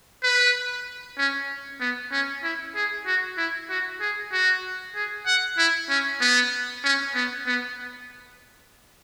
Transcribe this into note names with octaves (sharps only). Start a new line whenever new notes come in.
B4
C#4
B3
C#4
E4
G#4
F#4
E4
F#4
G#4
F#4
G#4
F#5
E4
C#4
B3
C#4
B3
B3